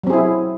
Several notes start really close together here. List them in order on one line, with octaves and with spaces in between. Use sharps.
F#3 C4 G#4 E4